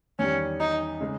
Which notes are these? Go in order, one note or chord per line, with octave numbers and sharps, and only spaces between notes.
E2 D#3 G3 C#4
D#4
C#3 G#3 D#4 G#4